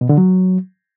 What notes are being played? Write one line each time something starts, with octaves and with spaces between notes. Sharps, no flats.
B2
D3
F#3